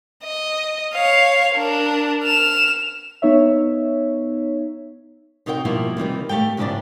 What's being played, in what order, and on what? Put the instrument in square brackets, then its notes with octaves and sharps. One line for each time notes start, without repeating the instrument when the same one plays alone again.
[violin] D#5
C#5 F5
D4 A#4
F6 E7
[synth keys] B3 D#4 C#5 E5
[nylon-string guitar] C3 D#4 F#4 A#4 C#5 G5
B2 F3 G3 A#3 E4 F4
C3 D#3 E3 G3
A3 G4 A4 F5 G5
G#2 C#3 F3 D4 E4 D5